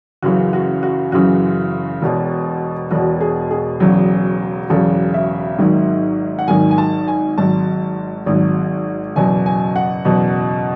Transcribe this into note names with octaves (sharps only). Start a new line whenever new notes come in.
F#1 F#2 C#3 E3 F#4
F#4
F#4
F#1 F#2 C#3 E3 F#4
E1 E2 B2
E1 E2 B2 F#4
G#4
G#4
E1 E2 C#3 F#3
E1 E2 C#3 F#3 A4
E5
G#1 G#2 D#3 F#3
F#5
G#1 G#2 D#3 F#3 G#5
G#5
A5
G#5
G#1 G#2 F#3 A5
G#1 G#2 F#3
F#1 E2 B2 F#3 G#5
G#5
F#5
F#1 E2 B2 F#3